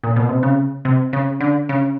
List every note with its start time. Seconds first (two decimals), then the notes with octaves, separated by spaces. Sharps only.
0.04 A#2
0.16 B2
0.29 C3
0.43 C#3
0.85 C3
1.13 C#3
1.41 D3
1.69 C#3